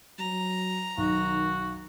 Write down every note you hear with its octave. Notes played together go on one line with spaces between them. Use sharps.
F#3 A#5
B1 D#3 F#4